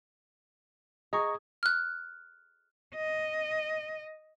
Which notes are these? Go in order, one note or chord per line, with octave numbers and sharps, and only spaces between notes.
G#4 D#5 A#5 C#6
F6 F#6
D#5